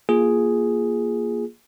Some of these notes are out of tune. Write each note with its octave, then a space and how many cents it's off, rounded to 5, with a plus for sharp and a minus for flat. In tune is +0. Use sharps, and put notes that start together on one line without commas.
A#3 +10 F4 +0 G#4 +0